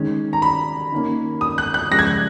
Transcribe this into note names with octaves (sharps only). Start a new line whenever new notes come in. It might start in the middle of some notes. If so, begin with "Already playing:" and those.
Already playing: D#3 G#3 C#4
A#5
B5
D#3 A#3 C#4
D#6
F#6
F#6
C#3 F3 G#3 A#6
G#6
F#6